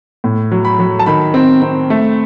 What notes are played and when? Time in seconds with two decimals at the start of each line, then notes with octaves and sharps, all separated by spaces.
0.24 A2
0.51 F#3
0.65 B5
0.79 F#3
0.99 A5
1.06 D#3 B5
1.34 C4
1.62 C4
1.90 A3